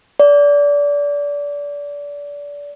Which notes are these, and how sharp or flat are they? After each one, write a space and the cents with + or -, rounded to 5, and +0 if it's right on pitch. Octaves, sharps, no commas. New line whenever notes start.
D5 -25